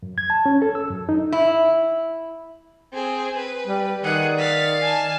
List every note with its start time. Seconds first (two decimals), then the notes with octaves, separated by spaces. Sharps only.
0.03 F#2
0.18 G#6
0.30 A5
0.46 C#4
0.62 A4
0.75 E6
0.90 F#2
1.09 D#4
1.32 E4
2.94 C4 G#4
3.38 B4
3.67 G3
4.03 D#3 G#4 D5 F#5
4.38 F5 A6 B6
4.82 G#5 A5